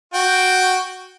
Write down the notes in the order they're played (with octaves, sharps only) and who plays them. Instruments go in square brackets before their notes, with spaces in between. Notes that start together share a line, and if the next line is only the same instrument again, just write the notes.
[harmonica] F#4 G5